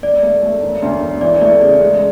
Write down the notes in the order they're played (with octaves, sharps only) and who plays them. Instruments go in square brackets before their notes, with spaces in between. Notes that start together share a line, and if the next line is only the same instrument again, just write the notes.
[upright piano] E1 [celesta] D5
[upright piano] A3
A3
E1
D2
E1
[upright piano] E3 [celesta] D5
[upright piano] A3 [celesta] D5
[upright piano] C#3 [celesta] D5
[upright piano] G#3